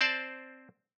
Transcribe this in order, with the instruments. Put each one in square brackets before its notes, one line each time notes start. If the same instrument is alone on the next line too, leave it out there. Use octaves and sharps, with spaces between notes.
[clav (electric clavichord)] C4 C5 D5 A5